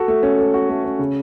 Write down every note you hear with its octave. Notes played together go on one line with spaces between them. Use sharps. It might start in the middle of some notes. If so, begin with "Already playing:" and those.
Already playing: F#4 A4
A3
C#4
A4
F#4
A3
C#4
C#3